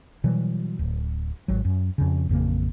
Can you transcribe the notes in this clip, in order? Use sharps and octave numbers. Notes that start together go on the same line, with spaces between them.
B2 E3 F#3 G3
D1
G#1 F#3
F#2
F2 C#3
A1 F2 C#3 A#3